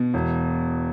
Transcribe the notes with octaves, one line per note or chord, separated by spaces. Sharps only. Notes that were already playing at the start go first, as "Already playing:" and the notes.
Already playing: B2
E1